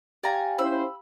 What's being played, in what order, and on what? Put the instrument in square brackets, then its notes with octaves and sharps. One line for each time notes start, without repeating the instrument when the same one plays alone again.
[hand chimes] G4 F5 G5 [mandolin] D5 G#5 A#5
[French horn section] C#4 E4 C5 [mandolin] B5 E6